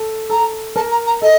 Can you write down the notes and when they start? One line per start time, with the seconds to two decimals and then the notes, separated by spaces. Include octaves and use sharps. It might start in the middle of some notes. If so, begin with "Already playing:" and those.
Already playing: A4
0.30 A4 A#5
0.76 A#4 A5
0.91 A#5
1.06 A#5
1.22 A4 D#5